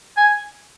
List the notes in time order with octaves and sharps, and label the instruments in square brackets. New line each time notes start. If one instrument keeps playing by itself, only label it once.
[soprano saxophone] G#5